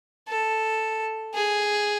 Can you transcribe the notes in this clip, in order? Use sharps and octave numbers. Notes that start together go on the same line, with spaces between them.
A4
G#4